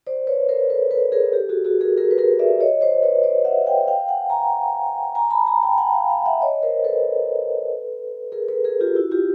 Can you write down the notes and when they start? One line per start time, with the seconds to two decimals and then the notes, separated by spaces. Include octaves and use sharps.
0.07 C5 D5
0.27 B4 C#5
0.49 A#4 C5
0.70 A4 B4
0.91 A4 B4
1.12 G#4 A#4
1.33 G4 A4
1.49 F#4 G#4
1.65 F#4 G#4
1.81 G#4 A#4
1.98 G#4 A#4
2.11 B4
2.18 G#4 A#4
2.39 D5 E5
2.60 C#5 D#5
2.81 C5 D5
3.03 B4 C#5
3.24 C5 D5
3.45 E5 F#5
3.66 F5 G5
3.88 F5 G5
4.08 F#5 G#5
4.30 G#5 A#5
5.15 G#5 A#5
5.30 A5 B5
5.46 G#5 A#5
5.63 G5 A5
5.78 F#5 G#5
5.94 F5 G5
6.10 F5 G5
6.26 E5 F#5
6.41 C#5 D#5
6.63 A#4 C5
6.84 A4 B4
8.32 G#4 A#4
8.48 A4 B4
8.64 G#4 A#4
8.81 F4 G4
8.96 E4 F#4
9.12 F4 G4